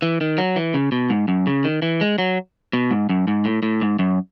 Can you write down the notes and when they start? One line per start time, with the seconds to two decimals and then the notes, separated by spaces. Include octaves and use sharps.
0.02 E3
0.21 D#3
0.38 F#3
0.56 E3
0.74 C#3
0.92 B2
1.10 G#2
1.28 F#2
1.47 C#3
1.64 D#3
1.82 E3
2.01 G#3
2.18 F#3
2.73 B2
2.91 G#2
3.09 F#2
3.27 G#2
3.45 A2
3.63 A2
3.81 G#2
3.99 F#2